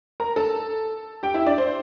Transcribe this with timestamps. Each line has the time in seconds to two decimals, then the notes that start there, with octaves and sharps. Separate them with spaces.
0.20 A#4 A#5
0.36 A4 A5
1.23 G4 G5
1.34 E4 E5
1.46 D4 D5
1.58 C5